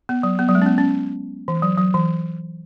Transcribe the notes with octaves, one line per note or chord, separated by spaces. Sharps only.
B3
F#3
B3
F#3
G#3
C#4
B3
C#4
E3
F#3
F#3
E3